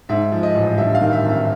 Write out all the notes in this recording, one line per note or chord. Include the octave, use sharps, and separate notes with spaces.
G#2 E5
F3
D#5
A1
G2 E5
F5
D#3
E5
G#1
E5